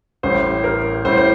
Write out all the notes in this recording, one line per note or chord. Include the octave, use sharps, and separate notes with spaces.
A1 A2 G3 C5
A#4
A1 A2 G3 C5
C5